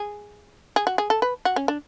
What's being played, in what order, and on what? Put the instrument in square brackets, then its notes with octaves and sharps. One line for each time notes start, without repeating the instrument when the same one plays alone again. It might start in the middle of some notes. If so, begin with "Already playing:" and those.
Already playing: [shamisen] G#4
G#4
F#4
G#4
A4
B4
F#4
C#4
D4